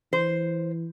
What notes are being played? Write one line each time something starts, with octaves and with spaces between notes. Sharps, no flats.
E3 C5